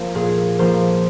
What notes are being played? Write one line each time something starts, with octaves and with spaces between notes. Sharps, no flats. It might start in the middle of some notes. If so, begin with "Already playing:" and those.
Already playing: F3 A#3 C5
A#2 G#4
F3 A#3 C5